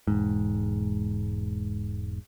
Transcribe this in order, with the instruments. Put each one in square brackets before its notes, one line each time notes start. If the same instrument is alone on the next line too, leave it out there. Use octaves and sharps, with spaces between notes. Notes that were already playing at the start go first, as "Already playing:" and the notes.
[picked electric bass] E1 G#2